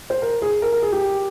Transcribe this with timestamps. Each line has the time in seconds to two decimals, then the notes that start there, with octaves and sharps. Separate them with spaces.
0.10 C5
0.22 A#4
0.42 G#4
0.62 A#4
0.72 A#4
0.82 G#4
0.92 G4